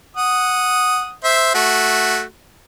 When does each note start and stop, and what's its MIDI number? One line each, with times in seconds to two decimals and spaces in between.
0.17 1.12 78
0.17 1.12 87
1.24 1.50 72
1.24 1.50 76
1.54 2.23 57
1.54 2.23 66